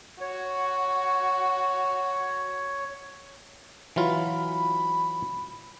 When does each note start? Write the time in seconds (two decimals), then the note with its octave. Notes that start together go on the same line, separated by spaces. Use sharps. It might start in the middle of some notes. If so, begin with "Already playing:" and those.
0.21 F#4 C#5
3.96 E3 F#3 F4 B5